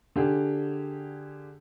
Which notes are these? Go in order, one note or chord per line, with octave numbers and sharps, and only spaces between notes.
D3 G4 G#4